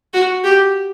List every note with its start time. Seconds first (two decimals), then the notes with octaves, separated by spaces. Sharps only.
0.14 F#4
0.44 G4